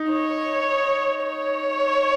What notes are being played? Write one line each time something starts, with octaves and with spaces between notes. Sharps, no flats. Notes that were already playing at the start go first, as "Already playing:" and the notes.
Already playing: D#4
C#5
C#5